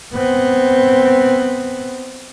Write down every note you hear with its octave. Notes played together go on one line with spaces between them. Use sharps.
B3 C4